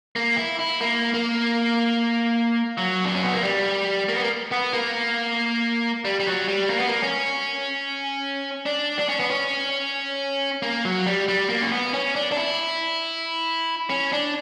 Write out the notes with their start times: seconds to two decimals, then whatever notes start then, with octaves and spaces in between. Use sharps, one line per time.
0.16 A#3
0.37 E4
0.59 E4
0.81 A#3
1.14 A#3
2.77 F#3
3.05 D4
3.15 C#4
3.24 B3
3.33 A#3
3.43 G3
4.09 A#3
4.15 B3
4.22 A#3
4.52 B3
4.73 A#3
6.05 G3
6.20 G3
6.26 F#3
6.48 G3
6.70 A#3
6.78 B3
6.88 A#3
7.02 C#4
8.66 D4
8.99 D4
9.09 C#4
9.20 B3
9.31 C#4
10.63 A#3
10.85 F#3
11.06 G3
11.28 G3
11.50 A#3
11.62 C#4
11.72 B3
11.94 C#4
12.15 D4
12.32 D4
12.37 E4
13.90 C#4
14.12 D4